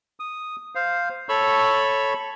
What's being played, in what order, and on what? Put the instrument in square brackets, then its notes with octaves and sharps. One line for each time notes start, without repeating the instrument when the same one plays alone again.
[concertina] D#6
C5 F5
A4 C#5 B5 C#6 E6